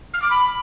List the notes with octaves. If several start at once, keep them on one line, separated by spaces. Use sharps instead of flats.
F6
D6
B5